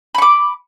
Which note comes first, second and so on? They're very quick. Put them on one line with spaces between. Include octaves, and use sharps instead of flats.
B5 C#6 D6